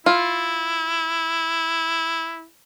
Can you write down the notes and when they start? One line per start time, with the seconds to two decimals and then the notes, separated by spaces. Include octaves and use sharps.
0.06 E4 F4